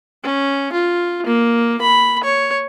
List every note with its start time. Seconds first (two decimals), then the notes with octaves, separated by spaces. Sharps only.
0.23 C#4
0.72 F4
1.26 A#3
1.81 B5
2.23 C#5